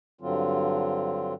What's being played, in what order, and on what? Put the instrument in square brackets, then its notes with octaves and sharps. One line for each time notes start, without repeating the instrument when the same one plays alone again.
[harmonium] G2 D3 F#3 C4 F4